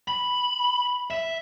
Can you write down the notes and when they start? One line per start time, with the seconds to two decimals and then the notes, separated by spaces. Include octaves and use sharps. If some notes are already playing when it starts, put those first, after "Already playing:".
0.08 B5
1.10 E5